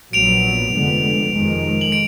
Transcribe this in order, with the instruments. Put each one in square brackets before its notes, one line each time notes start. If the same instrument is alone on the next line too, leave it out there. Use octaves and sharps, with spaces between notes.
[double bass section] A#1 A#2 F#3 B3 [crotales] D7 F7
[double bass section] F1 F2 D3 G#3 B3
F1 F2 D#3 G#3
[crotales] F#7
D7